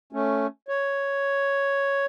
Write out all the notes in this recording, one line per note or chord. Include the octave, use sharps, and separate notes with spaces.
A3 C#4
C#5